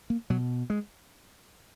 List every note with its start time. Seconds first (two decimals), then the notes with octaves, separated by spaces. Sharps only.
0.10 A#3
0.30 B2 F#3
0.70 G#3